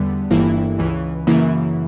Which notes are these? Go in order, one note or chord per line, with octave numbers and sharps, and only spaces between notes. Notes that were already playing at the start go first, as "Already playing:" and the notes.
Already playing: E2 D3 G3 B3
G1 G2 E3 A#3 E4
C#2 C#3 E3
F#2 C#3 E3 A#3 E4